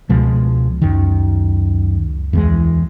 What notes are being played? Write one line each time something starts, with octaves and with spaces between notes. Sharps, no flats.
C#2 B2 F3 G#3
F#2 D#3
E2 E3 G#3